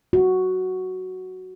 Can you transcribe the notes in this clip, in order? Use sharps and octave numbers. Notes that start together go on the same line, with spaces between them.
F#4